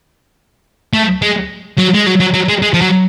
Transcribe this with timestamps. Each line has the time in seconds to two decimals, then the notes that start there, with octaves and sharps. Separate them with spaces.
0.94 A3
1.22 G#3
1.78 F#3
1.94 G#3
2.07 F#3
2.20 F#3
2.34 F#3
2.49 G#3
2.62 G#3
2.74 F3
2.81 F#3